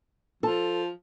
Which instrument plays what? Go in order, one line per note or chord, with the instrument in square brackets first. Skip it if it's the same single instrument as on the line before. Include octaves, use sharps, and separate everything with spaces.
[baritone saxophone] F3 [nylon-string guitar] A4 A5